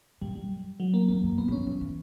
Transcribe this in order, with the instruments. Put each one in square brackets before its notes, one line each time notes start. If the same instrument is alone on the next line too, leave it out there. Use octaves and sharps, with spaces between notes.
[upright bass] A#2 [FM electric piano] G3
[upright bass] F#2 [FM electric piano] G3
[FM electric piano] F#3
A#3
[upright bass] E2 [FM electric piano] A#3
[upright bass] F#2
[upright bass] A#2 [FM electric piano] B3
[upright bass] B2
[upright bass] C#3 [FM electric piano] C#4
[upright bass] E3
E3